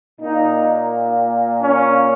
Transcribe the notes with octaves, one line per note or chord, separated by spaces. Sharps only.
A#2 A#3 D#4
C#4